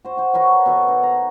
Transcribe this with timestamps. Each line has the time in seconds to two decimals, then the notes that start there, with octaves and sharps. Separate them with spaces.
0.05 F#4 C5
0.17 F#4 C5
0.34 F#4 A#4 B4 C#5
0.66 B2 A4 B4 C#6
0.88 D#4
1.03 A#5